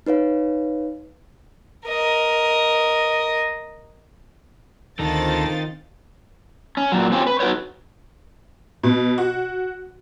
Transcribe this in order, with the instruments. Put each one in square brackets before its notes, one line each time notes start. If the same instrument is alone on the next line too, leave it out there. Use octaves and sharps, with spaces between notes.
[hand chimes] D#4 B4 C#5 F5
[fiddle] A#4 D#5
[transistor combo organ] D2 A4 A#5 [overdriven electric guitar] D#3 D#4 [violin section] C4 F4 A6
[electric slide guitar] C#4
A#2 F#3
C4 C#4 F4 G4
B4
D#4 F#4 B4 C#5
[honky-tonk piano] B2
F#4